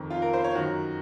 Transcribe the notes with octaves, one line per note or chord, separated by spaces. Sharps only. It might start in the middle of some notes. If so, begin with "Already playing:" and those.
Already playing: F2 D#3
F4
A#4
C5
C#5
F#2 D#3 F#4